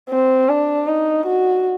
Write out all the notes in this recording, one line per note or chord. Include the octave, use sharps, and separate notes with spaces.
C4
D4
D#4
F#4